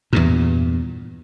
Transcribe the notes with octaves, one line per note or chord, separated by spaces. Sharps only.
E2 G2 A#2